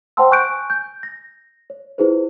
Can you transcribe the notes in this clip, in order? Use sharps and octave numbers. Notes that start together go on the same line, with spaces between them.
C5 F#5 G5 A5 C6 E6
G#5 C#6 F#6 G6 D7
G6
A#6
C#5
E4 F4 G#4 B4 C5